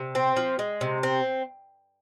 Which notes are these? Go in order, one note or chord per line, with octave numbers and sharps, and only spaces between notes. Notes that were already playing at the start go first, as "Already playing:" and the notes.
Already playing: C3
C4
F3
G#3
C3
C4